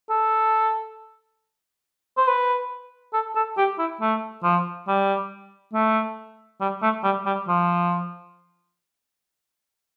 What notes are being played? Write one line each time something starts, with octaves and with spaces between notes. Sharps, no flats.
A4
C5
B4
A4
A4
G4
E4
A3
F3
G3
A3
G3
A3
G3
G3
F3